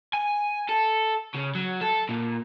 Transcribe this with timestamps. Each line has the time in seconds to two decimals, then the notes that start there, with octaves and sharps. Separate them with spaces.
0.13 G#5
0.69 A4
1.35 C#3
1.55 F#3
1.81 A4
2.09 A#2